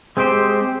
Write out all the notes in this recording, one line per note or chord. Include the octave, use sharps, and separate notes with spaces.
G#3 C4 G4 C5